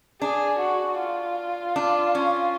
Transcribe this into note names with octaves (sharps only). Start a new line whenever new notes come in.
D4 G#4
F#4
F4
D4
C#4